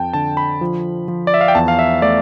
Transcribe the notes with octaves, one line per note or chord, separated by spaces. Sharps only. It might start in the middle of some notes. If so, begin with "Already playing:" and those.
Already playing: F2 G5 A5
D3 A5
B5
F3
F3
D5
E5
F5
G5
E2 A5
F5
E5
A3 D5